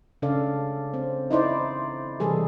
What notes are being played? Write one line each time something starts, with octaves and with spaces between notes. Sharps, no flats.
C#3 D4 A4 D5 F5
C4
D#4 E4 C5 D5
C3 E3 G3 G#4 A4